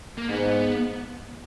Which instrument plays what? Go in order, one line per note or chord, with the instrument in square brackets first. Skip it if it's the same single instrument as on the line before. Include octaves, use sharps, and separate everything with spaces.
[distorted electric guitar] A#3
[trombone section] G#2 [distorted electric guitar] B3